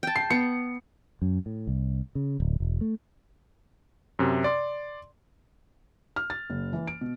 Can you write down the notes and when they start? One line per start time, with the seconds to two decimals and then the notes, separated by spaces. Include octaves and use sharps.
0.03 G5 A5
0.16 C7
0.30 B3 C#7
1.22 F#2
1.46 A2
1.67 C2
2.15 C#3
2.40 D1
2.60 E1
2.81 A3
4.19 F#2 C3
4.44 D5 C6
6.16 F6
6.30 A6
6.50 F#1
6.73 E3
6.87 D7
7.01 B2